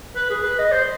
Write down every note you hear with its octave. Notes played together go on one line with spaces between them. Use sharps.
B4
G#4
B4
D#5
C5